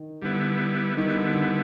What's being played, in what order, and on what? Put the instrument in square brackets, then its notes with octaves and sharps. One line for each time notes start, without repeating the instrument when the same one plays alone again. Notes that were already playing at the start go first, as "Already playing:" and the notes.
Already playing: [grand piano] D#3
[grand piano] D3 [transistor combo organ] G3 B3 E4
[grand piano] D#3 [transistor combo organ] G3 B3 E4
[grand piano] D3
D3